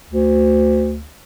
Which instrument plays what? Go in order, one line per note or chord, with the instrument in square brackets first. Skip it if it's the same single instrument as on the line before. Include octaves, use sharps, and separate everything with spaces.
[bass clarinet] D2